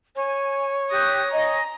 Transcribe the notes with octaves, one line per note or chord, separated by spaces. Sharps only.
C#5 G#5
G4 D#6 F#6 A#6
D#5 G#5 A#5